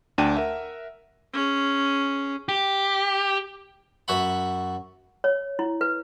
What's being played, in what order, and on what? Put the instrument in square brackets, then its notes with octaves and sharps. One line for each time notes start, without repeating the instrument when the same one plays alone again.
[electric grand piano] D2 D4 G5 A5 D#7
A#4 E5 F#5
[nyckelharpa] C#4 G#4
[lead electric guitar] G4
[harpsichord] F#2 F#4 E5 F#5 B5
[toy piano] C#5
E4
B4